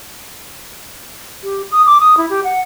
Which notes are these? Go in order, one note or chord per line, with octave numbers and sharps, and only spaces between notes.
G4
D#6
D6
D#6
E4
G4
F#5